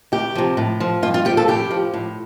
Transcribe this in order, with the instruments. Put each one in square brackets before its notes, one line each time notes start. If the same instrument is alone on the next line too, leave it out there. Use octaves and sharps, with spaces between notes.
[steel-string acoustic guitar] D2 G4
C3 F3
A2
F3
G2 F4
F4
F3 G4
A4
A2 G4
F3
A2